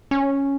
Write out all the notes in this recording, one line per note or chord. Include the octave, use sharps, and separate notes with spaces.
C#4